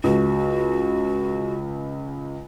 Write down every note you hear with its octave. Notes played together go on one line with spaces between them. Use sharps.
C#2 F#4